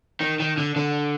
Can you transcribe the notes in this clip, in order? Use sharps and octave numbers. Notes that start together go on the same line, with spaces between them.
D#3
D#3
D3
D3